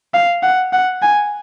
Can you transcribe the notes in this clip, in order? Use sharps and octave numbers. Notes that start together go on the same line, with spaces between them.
F5
F#5
F#5
G#5